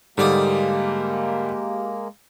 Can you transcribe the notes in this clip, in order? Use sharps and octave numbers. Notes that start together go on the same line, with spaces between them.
G#2 D3 G3 G#3 A#3 G4 D5 D#6